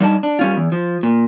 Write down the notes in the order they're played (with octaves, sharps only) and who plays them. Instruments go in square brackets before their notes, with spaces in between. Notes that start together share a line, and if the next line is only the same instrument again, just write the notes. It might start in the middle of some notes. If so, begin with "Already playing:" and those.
[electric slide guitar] G2 G3 D4 D#4 D#5 A5
D4
G3 C#4 F4
E2
F3
A#2